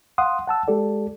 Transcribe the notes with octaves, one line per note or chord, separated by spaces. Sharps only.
F5 F#5 C6 D#6
F#5 A5 E6
G#3 G4 A4 D5